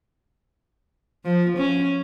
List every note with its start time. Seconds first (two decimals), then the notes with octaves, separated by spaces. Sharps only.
1.25 F3
1.58 C#4